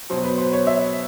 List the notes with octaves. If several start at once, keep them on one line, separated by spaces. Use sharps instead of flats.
B2 F#3 C5
B4
C5
C#5
E5